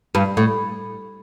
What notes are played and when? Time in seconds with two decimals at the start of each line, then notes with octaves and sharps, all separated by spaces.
0.15 G2
0.37 A2